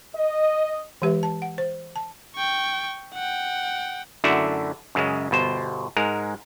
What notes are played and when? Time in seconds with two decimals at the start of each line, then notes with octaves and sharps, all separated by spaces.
0.15 D#5
1.02 E3 G#3 G4 B4 E5
1.23 A5
1.42 F#5
1.58 C5
1.96 A5
2.36 G5 C#6
3.14 F#5 G5
4.24 F#2 D3 A3 D4 E4 F#4
4.95 F#2 C#3 G#3
5.31 G1 B2 C5
5.96 G#2 G#3 A#4